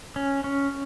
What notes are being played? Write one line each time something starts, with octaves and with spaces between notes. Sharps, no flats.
C#4
C#4